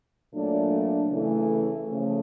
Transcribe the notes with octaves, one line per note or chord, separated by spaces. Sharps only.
A#2 F#3 A3 D4
C#3 E3 A3
C#3 F3 A3